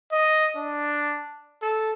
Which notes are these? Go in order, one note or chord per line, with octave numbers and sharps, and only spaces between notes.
D#5
D4
A4